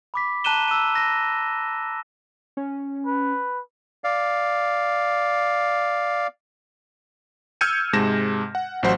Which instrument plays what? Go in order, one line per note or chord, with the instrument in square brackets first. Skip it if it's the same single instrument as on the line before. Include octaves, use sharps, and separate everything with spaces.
[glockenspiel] B5 D6 B6
A5 A#5 F#6 D#7 E7 G7
E6 D#7
A#6
[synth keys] C#4
[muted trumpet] B4
[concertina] D5 F5
[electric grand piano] E6 F6 G6 G#6 C#7 D#7
G#2 C3 G#3 A5 A#6 E7
F#5
A1 F#3 C5 F#5 C6